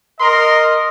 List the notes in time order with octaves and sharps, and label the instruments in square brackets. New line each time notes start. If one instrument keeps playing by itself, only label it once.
[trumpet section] A#4 C6 [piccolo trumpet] D#5